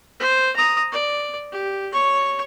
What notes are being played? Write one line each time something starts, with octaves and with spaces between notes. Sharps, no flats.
C5
A#5 D#6
D5
G4
C#5 C#6